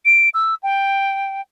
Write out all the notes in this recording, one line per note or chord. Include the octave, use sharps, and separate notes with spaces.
D7
E6
G5